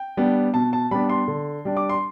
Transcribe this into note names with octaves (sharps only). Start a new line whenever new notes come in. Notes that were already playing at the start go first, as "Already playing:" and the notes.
Already playing: G5
G3 B3 D4
B2 A5
A5
G3 B3 D4 B5
C6
D3
G3 D4
D6
C6